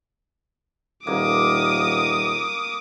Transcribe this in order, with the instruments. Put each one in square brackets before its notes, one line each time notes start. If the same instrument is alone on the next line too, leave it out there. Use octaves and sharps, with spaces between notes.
[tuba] D#1 [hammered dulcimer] A#3 [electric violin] D6 D#6